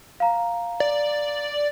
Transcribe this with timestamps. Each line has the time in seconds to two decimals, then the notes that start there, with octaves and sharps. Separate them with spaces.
0.20 F5 A#5
0.80 D5